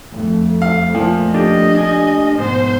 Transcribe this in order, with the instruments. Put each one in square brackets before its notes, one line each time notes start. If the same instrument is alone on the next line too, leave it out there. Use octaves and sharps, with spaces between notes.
[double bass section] F2 A3
[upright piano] F5
A#2 F3
[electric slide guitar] D4 G4 [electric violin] D#5
[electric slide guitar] D4 G4 G#5
[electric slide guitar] G#2 B2 [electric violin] C5